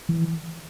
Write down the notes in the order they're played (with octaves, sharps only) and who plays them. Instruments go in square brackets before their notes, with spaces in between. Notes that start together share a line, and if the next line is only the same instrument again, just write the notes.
[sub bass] E3